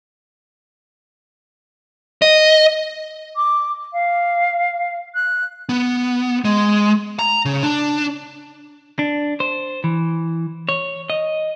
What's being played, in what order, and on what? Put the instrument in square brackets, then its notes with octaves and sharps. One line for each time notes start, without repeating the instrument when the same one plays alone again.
[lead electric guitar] D#5
[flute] D6
F5
F#6
[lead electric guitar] B3
G#3
A#5
C#3
D4
[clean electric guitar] D4
C5
E3
C#5
D#5